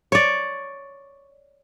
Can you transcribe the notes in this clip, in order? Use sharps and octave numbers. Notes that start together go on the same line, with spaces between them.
C#5 D5